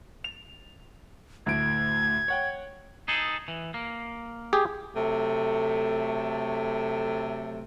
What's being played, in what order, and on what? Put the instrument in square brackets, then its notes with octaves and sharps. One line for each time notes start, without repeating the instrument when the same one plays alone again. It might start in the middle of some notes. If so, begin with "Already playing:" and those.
[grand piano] F7
[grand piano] D2 A2 D7 [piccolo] G#6
[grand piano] C#5 F#5 G5
[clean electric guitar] D#4 G#4 A4
E3
A#3
[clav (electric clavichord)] G4 G#4
[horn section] C3 F#3 A3